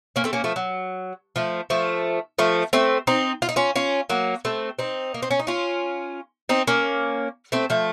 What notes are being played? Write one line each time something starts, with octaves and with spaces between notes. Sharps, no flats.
A#3 C#4
A3 C4
A#3 C#4
F3 A3
F#3
F3 A3
F3 A3
F3 A3
A3 C4
C4 D#4
F4
D#4
C#4 F4
C#4 F4
F#3 A#3
A3 C4
C4 D#4
A#3
C4
C#4
D#4
C#4 F4
C4 D#4
A#3 C#4
A3 C4
F3 A3